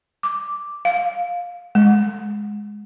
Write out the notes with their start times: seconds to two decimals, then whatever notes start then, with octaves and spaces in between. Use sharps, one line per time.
0.23 D6
0.85 F5
1.75 G#3